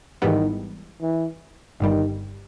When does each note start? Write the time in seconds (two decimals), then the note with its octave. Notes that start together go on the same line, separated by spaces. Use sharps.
0.22 G#1 G#2 D#3 E3 G3 B3
1.02 E3
1.80 G1 G2 D#3 G3